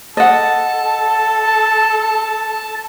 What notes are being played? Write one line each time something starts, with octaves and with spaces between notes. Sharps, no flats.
A4 D#5 F#5 A5